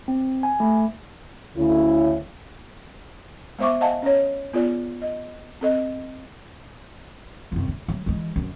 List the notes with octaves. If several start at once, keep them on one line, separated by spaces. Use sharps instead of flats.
C4
G#5
A3
D2 C#3 E4
G#3 B3 C5 E5 C#6 D6
C5 D#5 F5 F#5 G#5 A5
C#4 C#5
B3 F4 G#4 D5
D#5
C4 A4 D#5
C2 F#2
D4
F#3
E3 G#3
F#2